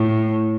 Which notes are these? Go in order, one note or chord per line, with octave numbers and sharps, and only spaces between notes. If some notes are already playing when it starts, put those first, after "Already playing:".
Already playing: A2